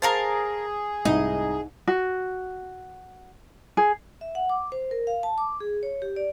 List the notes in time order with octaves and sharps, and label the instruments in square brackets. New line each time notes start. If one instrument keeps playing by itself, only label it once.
[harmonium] G#4 [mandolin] A#4 F5 A5 [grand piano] C5
[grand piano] C2 G#2 E4 [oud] D#4 [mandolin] D#5
[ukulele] F#4
G#4
[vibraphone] E5
F#5
D6
C5
A#4
F5
A5
D6
G#4
C#5
G4
D5